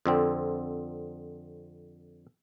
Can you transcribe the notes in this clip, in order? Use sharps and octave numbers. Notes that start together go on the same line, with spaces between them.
F2 D3 C4